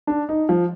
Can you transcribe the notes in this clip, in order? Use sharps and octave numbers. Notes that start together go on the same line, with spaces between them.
D4
D#4
F3